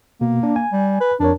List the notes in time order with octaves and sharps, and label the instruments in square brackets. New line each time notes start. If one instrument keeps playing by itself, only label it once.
[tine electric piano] B2 [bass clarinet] A#3
[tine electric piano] D4
G#5
[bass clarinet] G3
B4
[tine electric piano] F2 A#4 C#5 [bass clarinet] D4